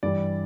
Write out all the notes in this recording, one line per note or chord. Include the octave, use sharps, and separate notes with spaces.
G2 E3 G3 D5